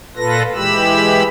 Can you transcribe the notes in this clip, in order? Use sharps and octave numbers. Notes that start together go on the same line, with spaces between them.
A#2 F4 A4 B4 A#6
E3 G#3 G4 B5 E6